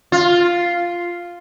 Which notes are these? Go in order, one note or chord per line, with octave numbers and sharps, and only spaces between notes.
F4